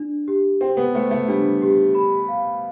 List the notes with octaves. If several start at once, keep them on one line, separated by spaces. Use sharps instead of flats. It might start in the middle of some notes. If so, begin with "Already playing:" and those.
Already playing: D4
G4
C4 G5
B3
A3 C5
A3
G3 D4
G4
B5
F5